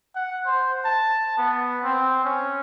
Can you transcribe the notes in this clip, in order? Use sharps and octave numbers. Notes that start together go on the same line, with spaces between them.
F#5
C5
A5
B3
C4
C#4